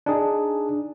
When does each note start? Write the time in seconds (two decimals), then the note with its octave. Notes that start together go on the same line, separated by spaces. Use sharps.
0.06 D4 D#4 G#4